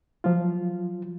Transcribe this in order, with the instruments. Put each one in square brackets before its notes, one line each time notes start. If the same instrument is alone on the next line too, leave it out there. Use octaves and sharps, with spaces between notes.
[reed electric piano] F3 F#3 F4